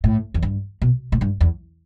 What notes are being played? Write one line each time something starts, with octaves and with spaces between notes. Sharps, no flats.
A2
E2
G2
B2
A2
G2
E2